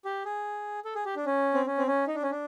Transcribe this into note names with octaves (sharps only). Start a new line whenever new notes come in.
G4
G#4
A4
G#4
G4
D4
C#4
C4
C#4
C4
C#4
D#4
D4
C#4
D4